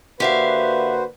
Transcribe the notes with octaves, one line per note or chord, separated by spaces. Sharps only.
D3 A#3 F#4 G4 B4 C5 E5 F5